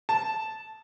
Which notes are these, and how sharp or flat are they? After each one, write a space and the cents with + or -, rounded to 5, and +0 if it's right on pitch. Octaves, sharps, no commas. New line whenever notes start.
A5 -10